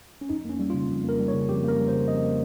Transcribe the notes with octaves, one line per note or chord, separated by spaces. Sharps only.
C#4
F2 D#4
A#3 C#4
G3
F4
C#3
F2
A#3 A#4
G3
C#5
C#3
F2 G4
A#3 A#4
G3
C5
C#3
F2 D#5
A#3